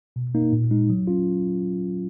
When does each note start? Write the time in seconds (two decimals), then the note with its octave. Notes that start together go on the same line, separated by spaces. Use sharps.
0.16 B2
0.35 A#3 D#4
0.53 A#2
0.71 G#3 D#4
0.90 F#3
1.07 C#4 F4